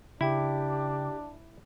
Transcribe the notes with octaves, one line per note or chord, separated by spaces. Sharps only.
C#3 D4 E4 G4 G5